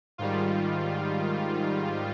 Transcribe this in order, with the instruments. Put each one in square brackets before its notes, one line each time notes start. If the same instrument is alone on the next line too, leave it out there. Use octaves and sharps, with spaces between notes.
[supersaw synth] G#2 D#3 G3 F4